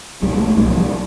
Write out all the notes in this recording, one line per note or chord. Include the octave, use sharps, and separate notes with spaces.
C2 A#2 G3
A3
C2 A#2 G3
F3
G3